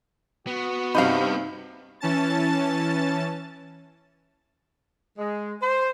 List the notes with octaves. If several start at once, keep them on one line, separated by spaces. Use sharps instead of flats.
B3 F#4
G2 C3 D#4 F5 B5
E3 C#4 A5 A6
G#3
C5